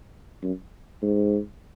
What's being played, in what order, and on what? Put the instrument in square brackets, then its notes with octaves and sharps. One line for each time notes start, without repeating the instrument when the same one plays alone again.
[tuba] F#2
G#2